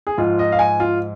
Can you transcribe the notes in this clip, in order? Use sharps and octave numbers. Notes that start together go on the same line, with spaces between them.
G#4
G#2 F3 F4
D#5
F5
G#5
F4